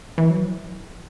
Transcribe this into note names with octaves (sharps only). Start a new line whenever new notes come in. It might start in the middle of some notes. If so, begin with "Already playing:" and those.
E3
F#3
F3